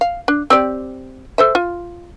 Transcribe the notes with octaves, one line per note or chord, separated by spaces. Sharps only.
F5
D4
C4 G4 D5
A4 C5 E5
F4